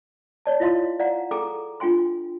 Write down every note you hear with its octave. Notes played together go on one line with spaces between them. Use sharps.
C#5 D5 A5
E4 F4 D#5 F5 C6
D5 F5 F#5 A#5
G#4 A4 G5 A#5 D6
D4 F4 G5 G#5 C6